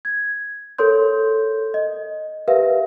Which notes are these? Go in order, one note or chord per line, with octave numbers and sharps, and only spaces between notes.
G#6
A4 A#4 C#5 C6 G6
D#5
G4 A#4 B4 E5 F5